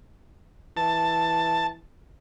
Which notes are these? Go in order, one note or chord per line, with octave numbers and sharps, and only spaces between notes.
E3 A5